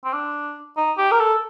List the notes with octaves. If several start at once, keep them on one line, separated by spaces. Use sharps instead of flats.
C4
D4
D#4
G4
A#4
A4